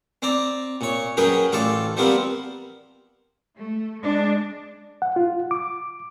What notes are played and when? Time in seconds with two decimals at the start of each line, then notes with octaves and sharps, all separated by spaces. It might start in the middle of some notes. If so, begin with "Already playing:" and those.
0.22 C4 D5 A#5
0.81 A#2 C#5
1.17 F#2 F#3 G#4 A#4 B4 G5
1.52 A1 F4 A4 D5 A5
1.97 F3 G3 B3 C4 A#4
3.57 A3
4.02 G#3 D4
5.02 F#5
5.16 F4
5.51 D6